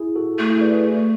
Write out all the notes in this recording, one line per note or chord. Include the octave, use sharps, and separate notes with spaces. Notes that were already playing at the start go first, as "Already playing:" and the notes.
Already playing: E4 G#4
F#4 A4
A3
E4 G#4
B4 D5
G#4 B4